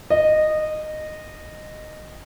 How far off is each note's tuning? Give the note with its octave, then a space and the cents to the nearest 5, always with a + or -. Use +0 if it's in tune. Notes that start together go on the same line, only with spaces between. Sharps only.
D#5 -15